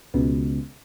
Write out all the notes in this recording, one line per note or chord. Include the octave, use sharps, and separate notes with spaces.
C#2 B2